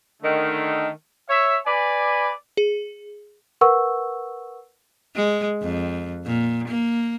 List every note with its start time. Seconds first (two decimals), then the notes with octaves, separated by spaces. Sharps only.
0.22 D3 D#3 A3
1.30 C#5 E5
1.67 B4 D5 G#5
2.57 G#4
3.61 A#4 B4 F#5 C#6 E6
5.15 G#3
5.62 F2
6.25 A#2
6.68 A#3